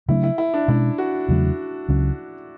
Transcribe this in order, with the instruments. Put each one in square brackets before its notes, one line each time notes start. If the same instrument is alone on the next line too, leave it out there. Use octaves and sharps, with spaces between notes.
[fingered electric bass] C#3 F#3 A3 D4 [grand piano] E4
[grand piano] E4
E4
D4
[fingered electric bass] B2 G#3 C#4 [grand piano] E4
[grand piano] F#4
[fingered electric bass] E2 C#3 F#3 A3
C#2 C#3 F#3 C#4